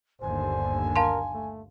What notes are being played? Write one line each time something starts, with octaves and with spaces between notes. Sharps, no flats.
G1 D#2 D3 C5 G#5
A#4 F5 A5 C6
A3